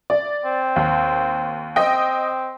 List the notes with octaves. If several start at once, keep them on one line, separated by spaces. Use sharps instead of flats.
D5
C4
D#2
C4 D#5 G5